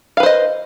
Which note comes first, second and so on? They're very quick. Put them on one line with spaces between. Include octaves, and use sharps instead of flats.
F5 B4 C5 D#5